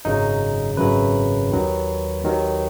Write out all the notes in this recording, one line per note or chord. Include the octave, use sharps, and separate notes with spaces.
G#1 F#2 C#3 F#3 D#4
G#1 F#2 C#3 F#3 B4
D#2 D#3 F#3
D#2 D#3 F#3